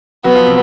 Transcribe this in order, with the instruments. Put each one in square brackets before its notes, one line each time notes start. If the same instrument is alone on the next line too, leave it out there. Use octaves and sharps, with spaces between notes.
[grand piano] F#3 F#4 [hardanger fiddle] B3
[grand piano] F3 F4
C3 C4